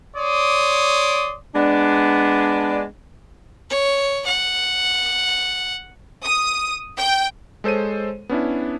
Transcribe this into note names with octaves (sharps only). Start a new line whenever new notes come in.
C#5 D5 C6 D6 D#6
G#3 B3 D4
C#5
F#5
D#6
G5
G#3 A4 C5 C#5 D#7
B3 C#4 D4 E4